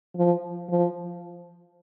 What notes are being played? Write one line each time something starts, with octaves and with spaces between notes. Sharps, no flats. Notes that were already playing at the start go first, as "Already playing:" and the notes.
F3
F3